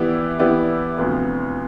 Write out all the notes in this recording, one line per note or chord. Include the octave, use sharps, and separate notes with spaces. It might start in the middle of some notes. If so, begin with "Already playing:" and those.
Already playing: E3 B3 E4 G4 D5
E3 B3 E4 G4 D5
D2 C3 F3 B3